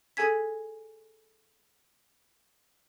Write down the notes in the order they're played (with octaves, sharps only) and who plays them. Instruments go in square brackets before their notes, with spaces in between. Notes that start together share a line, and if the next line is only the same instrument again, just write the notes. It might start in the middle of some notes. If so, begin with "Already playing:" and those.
[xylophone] G#4 A4 G#5 G#6 B6